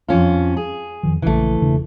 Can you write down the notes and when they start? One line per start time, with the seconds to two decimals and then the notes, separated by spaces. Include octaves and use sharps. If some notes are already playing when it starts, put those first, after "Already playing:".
0.08 F2 C#4 F4
0.57 G#4
1.03 F2 D#3 F3
1.22 A#1 C#3 E3 A3
1.62 E1 C#3 D4